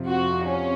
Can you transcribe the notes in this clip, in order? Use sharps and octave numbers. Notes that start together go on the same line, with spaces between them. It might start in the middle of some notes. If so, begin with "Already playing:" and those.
Already playing: F2 C3 F3
F#4
C#4